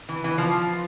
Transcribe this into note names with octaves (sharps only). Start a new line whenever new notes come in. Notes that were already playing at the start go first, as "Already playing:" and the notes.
E3
E3
F3